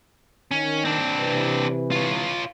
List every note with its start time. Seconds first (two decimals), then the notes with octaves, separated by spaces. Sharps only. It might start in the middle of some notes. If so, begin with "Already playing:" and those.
0.51 D#3 C#4
0.85 C4 D4
1.18 C3 E3 B4
1.91 F4 C#5